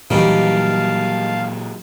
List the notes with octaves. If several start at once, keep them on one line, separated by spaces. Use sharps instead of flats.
A#2 D#3 E3 F#3 G3 F5 A5